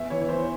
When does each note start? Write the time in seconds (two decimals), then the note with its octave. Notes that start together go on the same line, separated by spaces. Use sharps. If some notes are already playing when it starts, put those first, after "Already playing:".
Already playing: E2 E5
0.10 E3 C#5
0.21 C#5
0.29 E3 C5